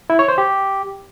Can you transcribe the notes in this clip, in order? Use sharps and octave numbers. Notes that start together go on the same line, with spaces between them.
E4
C#5
C5
G4